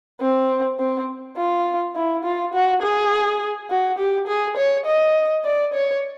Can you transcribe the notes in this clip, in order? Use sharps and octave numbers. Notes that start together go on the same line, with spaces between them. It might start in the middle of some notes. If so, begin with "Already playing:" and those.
C4
C4
F4
E4
F4
F#4
G#4
F#4
G4
G#4
C#5
D#5
D5
C#5